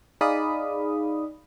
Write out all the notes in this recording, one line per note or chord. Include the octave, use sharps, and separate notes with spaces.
D#4 G#4 D5 F5 B5 D#6